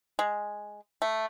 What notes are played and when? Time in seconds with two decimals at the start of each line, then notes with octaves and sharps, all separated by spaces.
0.19 G#3
1.02 A3